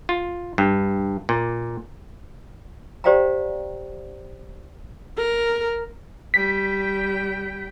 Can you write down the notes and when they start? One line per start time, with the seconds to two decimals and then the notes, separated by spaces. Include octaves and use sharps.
0.09 F4
0.58 G2
1.29 A#2
3.04 G4 C5 D5 F5 G5 A#5
5.17 A#4
6.34 G3 G5 B6